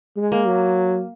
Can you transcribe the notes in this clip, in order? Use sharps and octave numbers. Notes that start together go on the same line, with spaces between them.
G#3
A#3
F#3